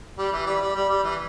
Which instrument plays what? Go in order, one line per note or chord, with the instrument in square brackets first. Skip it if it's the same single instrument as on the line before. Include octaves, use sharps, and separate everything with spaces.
[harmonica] G3
E3
G3
G3
G3
G3
E3